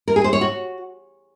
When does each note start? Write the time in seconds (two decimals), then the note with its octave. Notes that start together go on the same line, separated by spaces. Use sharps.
0.08 A#4
0.16 G#4
0.24 C5
0.33 C#5
0.41 F#4